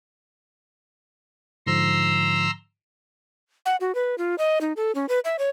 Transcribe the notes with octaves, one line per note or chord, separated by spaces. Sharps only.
G#2 D3 F3 A#5 C6 E6
F#5
F#4
B4
F4
D#5
D#4
A4
C#4
B4
E5
C#5